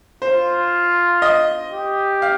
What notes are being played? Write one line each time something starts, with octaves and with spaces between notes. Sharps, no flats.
F4 C5
D#5
G4
F5